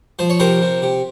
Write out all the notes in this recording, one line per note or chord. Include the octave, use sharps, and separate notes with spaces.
F3 C5
C#5
C3 A#4 C5
C3
C3